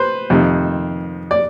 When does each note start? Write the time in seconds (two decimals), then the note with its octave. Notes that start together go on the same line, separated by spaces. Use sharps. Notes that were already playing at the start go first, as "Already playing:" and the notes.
Already playing: B4 C5
0.30 F2 C3 D#3
1.31 D5